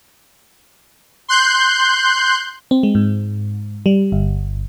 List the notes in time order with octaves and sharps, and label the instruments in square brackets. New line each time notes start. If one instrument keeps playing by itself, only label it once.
[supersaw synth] C6 F#6 G6
[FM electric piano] C4
G#3
G#2
G3
G1